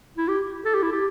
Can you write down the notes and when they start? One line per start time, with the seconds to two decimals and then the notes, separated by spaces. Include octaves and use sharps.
0.17 E4
0.28 G4
0.65 A4
0.74 G4
0.83 E4
0.92 G4